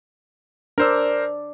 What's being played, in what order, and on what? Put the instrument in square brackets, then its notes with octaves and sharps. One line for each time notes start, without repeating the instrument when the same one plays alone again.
[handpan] D4 D5 [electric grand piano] A#4 C5 E6